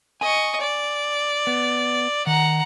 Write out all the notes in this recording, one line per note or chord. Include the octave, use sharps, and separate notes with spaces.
D#5 G#5 C#6
D5
B3
D#3 F#5 A#5